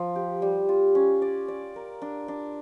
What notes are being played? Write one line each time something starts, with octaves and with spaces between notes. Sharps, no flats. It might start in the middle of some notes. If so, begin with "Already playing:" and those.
Already playing: F3
G4
G3
F4
C#4
D5
D5
A#4
D4
D4